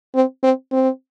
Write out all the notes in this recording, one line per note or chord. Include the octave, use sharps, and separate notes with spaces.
C4
C4
C4